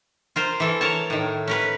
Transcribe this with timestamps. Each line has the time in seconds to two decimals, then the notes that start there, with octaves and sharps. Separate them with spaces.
0.36 F4 A#4 C5
0.60 E3 A4
0.81 A#4 C#5 A5
1.10 A2 D#3
1.48 C#4 A#4 B4